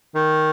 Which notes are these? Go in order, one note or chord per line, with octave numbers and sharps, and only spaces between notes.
D#3